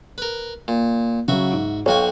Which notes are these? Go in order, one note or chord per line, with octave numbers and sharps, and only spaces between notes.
A#4 B4
A#2
C#3 F#3 F#4 E5
G#2
B1 F#4 C#5 F5 G5 G#5